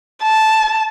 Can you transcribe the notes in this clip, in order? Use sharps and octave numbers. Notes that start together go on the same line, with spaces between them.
A5